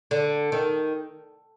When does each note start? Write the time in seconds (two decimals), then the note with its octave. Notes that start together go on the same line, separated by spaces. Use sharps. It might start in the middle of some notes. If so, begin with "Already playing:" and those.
0.11 D3
0.52 D#3